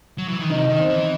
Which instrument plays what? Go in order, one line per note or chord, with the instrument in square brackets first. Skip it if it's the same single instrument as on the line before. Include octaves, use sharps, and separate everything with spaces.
[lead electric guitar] F#3
E3
D#3
[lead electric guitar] C3 [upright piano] D#4
[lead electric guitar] D#3
[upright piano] C4
[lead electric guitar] E3